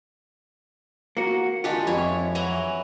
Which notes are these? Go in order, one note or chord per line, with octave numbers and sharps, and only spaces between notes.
A#3 F#4
D#3 G#3 D4 F4 G4
F2 E4 C#5
E3 F#3 A#5